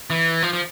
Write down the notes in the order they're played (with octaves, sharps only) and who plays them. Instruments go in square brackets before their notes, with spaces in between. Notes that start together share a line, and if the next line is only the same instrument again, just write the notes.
[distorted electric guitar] E3
F3
F3